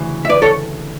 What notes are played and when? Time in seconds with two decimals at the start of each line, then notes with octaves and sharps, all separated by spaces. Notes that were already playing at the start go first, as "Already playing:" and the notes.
Already playing: D2 C#3 E3
0.25 E5
0.29 B4 D5
0.42 A4 C#5